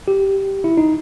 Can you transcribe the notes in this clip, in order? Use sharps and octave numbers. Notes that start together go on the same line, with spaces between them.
G4
E4
D#4